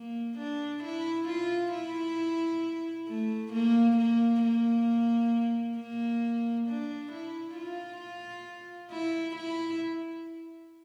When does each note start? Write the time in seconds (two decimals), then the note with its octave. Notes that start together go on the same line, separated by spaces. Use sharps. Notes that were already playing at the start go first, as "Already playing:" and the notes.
Already playing: A#3
0.38 D4
0.83 E4
1.28 F4
1.73 E4
3.08 A3
3.52 A#3
3.97 A#3
4.42 A#3
5.76 A#3
6.67 D4
7.12 E4
7.56 F4
8.91 E4
9.36 E4